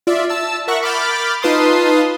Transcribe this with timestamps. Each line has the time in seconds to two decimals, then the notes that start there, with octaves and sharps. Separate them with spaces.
0.07 F4 D5 E5
0.29 A5 E6
0.68 A#4 E5 F#5 C#6 F#6
0.82 B5 D6 F6 G6 A6
1.42 D#4 F4 B4 A5 C6 D#6